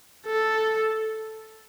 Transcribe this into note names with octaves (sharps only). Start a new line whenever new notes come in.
A4